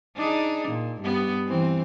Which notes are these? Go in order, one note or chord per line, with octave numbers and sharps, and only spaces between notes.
D4 D#4 G#4
A#2
G2 B3
E3 C4